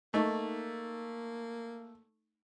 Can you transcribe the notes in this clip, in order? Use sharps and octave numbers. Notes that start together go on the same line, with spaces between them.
A3 A#3 D#4 D#5 C#6